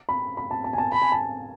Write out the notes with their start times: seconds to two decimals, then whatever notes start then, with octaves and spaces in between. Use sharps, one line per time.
0.09 B5
0.37 B5
0.51 A5
0.64 A5
0.73 G#5
0.78 A5
0.92 A5 B5
1.02 G#5
1.12 A5